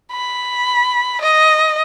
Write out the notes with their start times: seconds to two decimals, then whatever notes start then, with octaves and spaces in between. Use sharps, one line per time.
0.13 B5
1.22 D#5